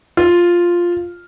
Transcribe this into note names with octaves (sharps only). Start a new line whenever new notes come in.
F4